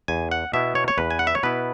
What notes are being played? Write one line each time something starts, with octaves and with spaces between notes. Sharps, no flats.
E2 G#5
F#5
B2 B3 E4 E5
C#5
C#5
E2 B4
G#5
F#5
E5
C#5
B2 B3 E4 B4